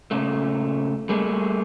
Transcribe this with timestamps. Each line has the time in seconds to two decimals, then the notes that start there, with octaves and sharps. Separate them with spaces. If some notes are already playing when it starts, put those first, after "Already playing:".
0.11 A#2 C#3 A3
1.09 G3 A3 A#3 G#4